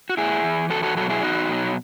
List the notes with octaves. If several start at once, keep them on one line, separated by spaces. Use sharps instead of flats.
F#4
A2 E4 G#4
E3
E2 F#4 A4
F#4 A4
B2 F#3 F#4 A4
E4 G#4
E2 D#4 F#4
B2 F#3